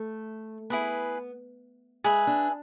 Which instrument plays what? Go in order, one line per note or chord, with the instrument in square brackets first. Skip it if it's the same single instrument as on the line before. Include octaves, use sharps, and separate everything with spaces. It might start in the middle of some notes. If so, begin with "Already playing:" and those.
Already playing: [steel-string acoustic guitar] A3
[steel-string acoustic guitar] B3 [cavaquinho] E4 G#4 B4
[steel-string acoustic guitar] G#3 [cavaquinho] G#4 B4 E5
[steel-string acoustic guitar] D4